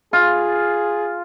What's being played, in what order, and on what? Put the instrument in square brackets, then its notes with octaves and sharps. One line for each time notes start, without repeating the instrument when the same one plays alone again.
[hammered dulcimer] F4 [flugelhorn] G#4